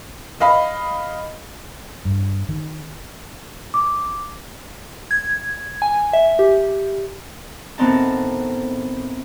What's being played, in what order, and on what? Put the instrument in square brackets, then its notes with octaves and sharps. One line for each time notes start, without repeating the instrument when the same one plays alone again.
[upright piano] D#5 F5 B5
[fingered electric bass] G2
D#3
[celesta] D6
[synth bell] G#6
G#5
E5
G4
[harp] A2 D#3 B3 C4 D#4 A5